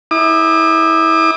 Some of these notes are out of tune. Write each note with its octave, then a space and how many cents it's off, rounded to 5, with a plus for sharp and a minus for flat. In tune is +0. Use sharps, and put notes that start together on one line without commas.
E4 -25 D6 +45